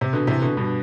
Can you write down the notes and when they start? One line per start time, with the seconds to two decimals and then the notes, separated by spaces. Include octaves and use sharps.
0.01 C3
0.13 B2 D3
0.27 C3 E3
0.42 B2 D3
0.57 G2 B2